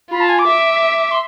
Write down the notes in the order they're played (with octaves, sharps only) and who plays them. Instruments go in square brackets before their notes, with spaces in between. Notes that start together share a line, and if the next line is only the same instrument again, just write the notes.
[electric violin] F4 [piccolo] B5
[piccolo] A5
G#5
D6
[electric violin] E5
[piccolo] C6